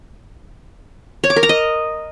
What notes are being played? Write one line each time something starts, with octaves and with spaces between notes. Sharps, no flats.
C#5
D6
A#4
A#5
D#5